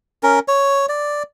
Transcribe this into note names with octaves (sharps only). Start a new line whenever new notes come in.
C#4 A#4
C#5
D5